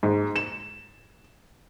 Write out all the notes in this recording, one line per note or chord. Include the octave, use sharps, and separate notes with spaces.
G#2
E7